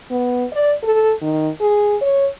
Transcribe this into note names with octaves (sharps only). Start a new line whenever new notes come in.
B3
D5
A4
D#3
G#4
C#5